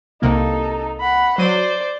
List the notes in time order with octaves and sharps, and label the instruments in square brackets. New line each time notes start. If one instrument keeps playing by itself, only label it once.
[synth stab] C2 C3 A#3 [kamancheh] D#4 A4
[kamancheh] F#5 B5
[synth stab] F#3 D#7 [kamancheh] C5 D5